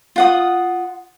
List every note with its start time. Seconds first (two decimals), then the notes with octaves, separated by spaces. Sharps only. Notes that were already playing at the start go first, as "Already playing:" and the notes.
0.16 F4 F#5 D#6